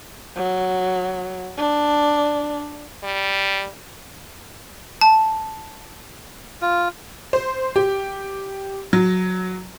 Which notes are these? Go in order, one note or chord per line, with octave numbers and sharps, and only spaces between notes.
F#3
D4
G3
A5
F4
C5
G4
F#3